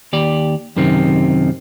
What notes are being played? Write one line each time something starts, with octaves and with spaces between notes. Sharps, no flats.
D#2 G4 D5
F#2 C3 D#3 C4